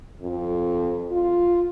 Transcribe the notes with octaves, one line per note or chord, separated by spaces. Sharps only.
F2
F4